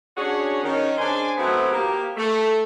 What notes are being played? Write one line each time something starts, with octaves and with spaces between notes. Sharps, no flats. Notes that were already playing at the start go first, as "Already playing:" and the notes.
C#4 D4 F#4 G#4 C#5
D#3 C#4
D4 G#4 C5 G#5
F#3 A3 B3 C4 D#4 E4
A#3 G4
A3